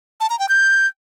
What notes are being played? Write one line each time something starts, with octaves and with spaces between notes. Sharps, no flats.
A5
A#5
G5
G6